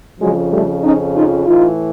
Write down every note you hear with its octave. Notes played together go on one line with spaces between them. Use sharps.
F2 C#3 F3 F#3 G#3
G3 A3
C#4 D#4
D#4 F4
A2 E3 D#4 F4